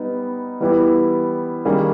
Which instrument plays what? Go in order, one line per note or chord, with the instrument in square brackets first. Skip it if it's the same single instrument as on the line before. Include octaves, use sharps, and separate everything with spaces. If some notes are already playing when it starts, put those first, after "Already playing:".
Already playing: [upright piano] G3 B3 D#4
E3 G3 B3 E4 G4
D#3 G3 A#3 C#4 G#4